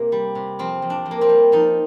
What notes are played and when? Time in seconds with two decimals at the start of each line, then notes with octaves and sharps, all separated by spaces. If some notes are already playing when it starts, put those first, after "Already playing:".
Already playing: C3 A#3
0.12 G3
0.35 C3
0.59 F2 C4
0.82 F2
0.90 D4
1.06 F2
1.11 A#3
1.21 C4
1.29 G3
1.52 F3 D#4